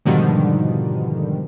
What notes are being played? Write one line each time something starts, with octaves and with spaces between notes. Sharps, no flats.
G#2 B2 D3 D#3 F3 G3